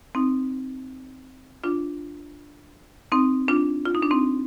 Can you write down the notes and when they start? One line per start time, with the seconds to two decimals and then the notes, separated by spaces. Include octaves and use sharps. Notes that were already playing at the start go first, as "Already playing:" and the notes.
0.15 C4 D#4
1.64 D4 F4
3.12 C4 D#4
3.48 D4 F4
3.86 F4
3.95 D#4
4.02 D4
4.11 C4 D#4